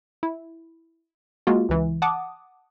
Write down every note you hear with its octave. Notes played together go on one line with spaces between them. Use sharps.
E4
G#3 A#3 F4 F#4
C#2 E3
F#5 A5 D6 D#6